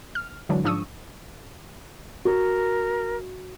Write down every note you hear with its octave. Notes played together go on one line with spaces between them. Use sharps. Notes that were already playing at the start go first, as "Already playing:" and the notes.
F6
D3 E3 F#3 G#3 D4
G#2 F3 D4 C#6 D#6 E6
F#4 A#4